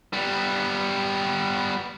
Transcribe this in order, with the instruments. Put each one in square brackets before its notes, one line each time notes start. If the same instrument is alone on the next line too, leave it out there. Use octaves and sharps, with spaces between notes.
[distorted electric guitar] G3 B3